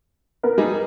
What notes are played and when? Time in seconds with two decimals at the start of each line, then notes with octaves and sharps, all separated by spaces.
0.43 B3 A#4
0.58 G3 D#4 G#4